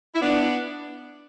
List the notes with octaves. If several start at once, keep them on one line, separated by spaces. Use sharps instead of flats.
E4
B3 D4